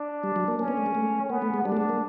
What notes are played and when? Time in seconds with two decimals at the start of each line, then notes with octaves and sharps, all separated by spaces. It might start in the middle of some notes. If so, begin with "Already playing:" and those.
Already playing: D4
0.24 G3
0.36 F#3
0.48 A#3
0.59 A#3 C#4
0.68 B3
0.77 A3
0.86 G#3
0.95 A3
1.30 A#3 B3
1.42 A3
1.54 G#3
1.65 G3 D4
1.72 A3
1.77 G#3
1.89 A#3